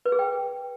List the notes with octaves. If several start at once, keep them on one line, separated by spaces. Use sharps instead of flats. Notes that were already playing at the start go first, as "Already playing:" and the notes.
B4
G#4
G5